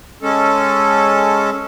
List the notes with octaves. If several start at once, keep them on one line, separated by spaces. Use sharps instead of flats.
G#3 C#4 A4